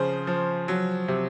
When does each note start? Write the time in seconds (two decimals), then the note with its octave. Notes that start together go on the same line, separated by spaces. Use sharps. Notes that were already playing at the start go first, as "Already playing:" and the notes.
Already playing: C#3 F3 C5
0.27 F3
0.68 F#3
1.08 C3